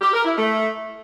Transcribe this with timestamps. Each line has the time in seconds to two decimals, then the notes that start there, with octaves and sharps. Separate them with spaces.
0.01 G4
0.13 A#4
0.24 E4
0.36 A3